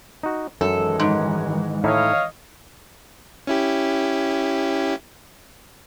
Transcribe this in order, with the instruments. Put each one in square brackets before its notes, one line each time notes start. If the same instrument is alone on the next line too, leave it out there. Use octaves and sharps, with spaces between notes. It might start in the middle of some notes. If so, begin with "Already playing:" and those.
[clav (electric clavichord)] D#4 F#4
[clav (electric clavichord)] F#2 [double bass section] D#3 E3 G#3 [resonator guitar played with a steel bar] A4
[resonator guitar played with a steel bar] G#2
[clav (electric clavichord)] A2 D#4 E4 [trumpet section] C#5 D#5 F5
[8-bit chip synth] C#4 E4 G4